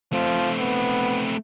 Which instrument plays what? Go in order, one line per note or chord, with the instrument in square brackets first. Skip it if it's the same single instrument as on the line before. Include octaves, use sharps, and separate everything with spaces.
[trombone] F3 [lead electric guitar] A3 C4
[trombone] B3